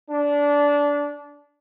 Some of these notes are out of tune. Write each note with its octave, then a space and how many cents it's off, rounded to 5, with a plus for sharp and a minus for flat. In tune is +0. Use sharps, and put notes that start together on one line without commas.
D4 -20